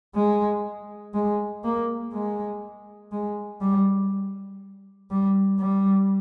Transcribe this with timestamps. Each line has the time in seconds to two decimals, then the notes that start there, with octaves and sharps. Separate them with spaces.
0.15 G#3
1.14 G#3
1.64 A#3
2.13 G#3
3.12 G#3
3.61 G3
5.11 G3
5.60 G3